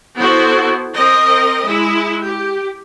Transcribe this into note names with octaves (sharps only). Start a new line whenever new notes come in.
B3 E4 F#4 A4 C5
C4 A#4 D#5
G#3 E4
G4